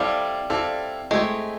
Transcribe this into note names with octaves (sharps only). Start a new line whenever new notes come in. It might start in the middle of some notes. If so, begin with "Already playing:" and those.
Already playing: G3 C4 E4 A4 D5 F5
C4 E4 A4 D5 F5
G#3 A3 C4 E4 G4